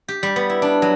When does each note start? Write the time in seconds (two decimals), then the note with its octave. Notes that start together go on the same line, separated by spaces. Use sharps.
0.08 G4
0.23 G3
0.36 B3
0.49 E4
0.62 D4
0.82 F#3